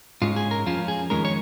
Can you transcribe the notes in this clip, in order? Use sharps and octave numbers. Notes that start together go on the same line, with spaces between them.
G#2 G#3 C#4 F4
G#4
A#4
F2 F3 C#4 F4
G#4
F2 D#3 G#3 C#4 A#4
C#5